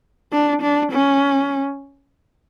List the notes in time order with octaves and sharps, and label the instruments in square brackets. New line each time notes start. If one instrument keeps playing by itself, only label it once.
[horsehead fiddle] D4
D4
C#4